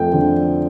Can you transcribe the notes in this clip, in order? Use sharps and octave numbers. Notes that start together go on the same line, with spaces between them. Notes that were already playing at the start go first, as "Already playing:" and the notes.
Already playing: F2 A3 G5
D3